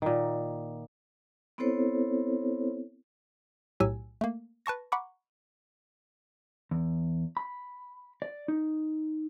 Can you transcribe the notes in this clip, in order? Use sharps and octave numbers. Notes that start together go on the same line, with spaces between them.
A#2 D#3
B3 C4 E4 A4 C5 C#5
B1 A2 F#3 G4 G#5 E6
A3 A#3
B4 A5 C#6 A#6
F#5 A#5 B5 C#6 D6
E2
B5
D5
D#4